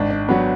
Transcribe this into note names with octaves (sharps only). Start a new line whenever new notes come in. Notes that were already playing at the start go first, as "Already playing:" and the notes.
Already playing: G#1 D4
D4
F#3 B3 D4